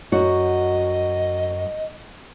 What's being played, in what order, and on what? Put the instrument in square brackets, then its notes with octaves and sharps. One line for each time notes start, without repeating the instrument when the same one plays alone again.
[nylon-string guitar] F#2 F#4 [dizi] D#5